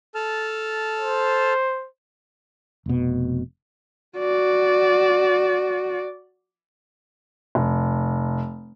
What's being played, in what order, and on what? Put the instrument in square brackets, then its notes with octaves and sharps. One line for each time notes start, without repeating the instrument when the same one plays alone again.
[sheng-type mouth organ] A4 A5 F6
[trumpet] C5
[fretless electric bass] F1 B2
[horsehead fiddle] F#4 D5
[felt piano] F1